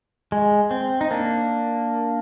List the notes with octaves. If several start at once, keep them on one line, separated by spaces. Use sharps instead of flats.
G#3
C4
D#4
A#3 D4